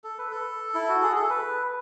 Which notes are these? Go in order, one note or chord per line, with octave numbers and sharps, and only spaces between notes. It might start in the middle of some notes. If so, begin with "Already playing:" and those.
A4
B4
A4
E4
F#4
G#4
A4
B4